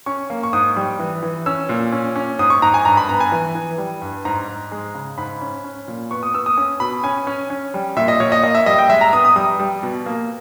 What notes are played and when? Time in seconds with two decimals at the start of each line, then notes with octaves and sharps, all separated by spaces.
0.06 C#4 C#6
0.30 A#3
0.43 C#6
0.53 G#2 D#6
0.77 G3
0.99 E3
1.23 E3
1.46 C#4 E6
1.69 A#2
1.92 C#4
2.16 C#4
2.39 G#2 D#6
2.50 C#6
2.62 G#2 A#5
2.74 G#5
2.85 G2 A#5
2.97 B5
3.09 B3 A#5
3.20 G#5
3.32 E3
3.55 E3
3.78 G3
4.02 G2
4.25 G#2 A#5
4.48 G#2
4.71 G#3
4.94 C#3
5.18 G#2 B5
5.41 C#4
5.64 C#4
5.88 A#2
6.11 B3 C#6
6.23 D#6
6.34 B3 E6
6.46 D#6
6.57 C#4 D#6
6.80 B2 B5
7.04 C#4 G#5
7.27 C#4
7.50 C#4
7.74 G3
7.97 A#2 E5
8.08 D#5
8.20 A#2 C#5
8.32 D#5
8.43 A#3 D#5
8.55 E5
8.66 G3 D#5
8.78 G5
8.90 G#3 E5
9.01 A#5
9.13 B3 D#6
9.25 D#6
9.36 G3 D#6
9.59 G3
9.83 B2
10.06 A#3